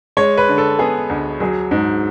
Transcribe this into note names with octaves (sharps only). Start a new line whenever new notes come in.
G#3 C#5
B4
D3
A4
B3 G#4
D2
F#3 G#4
G#2